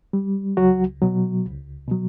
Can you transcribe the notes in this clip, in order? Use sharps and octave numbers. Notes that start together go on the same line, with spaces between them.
G3
C#2 F#3 F#4
B2 F#3
C#2
B2 F#3